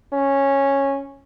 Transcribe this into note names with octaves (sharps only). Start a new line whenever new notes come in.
C#4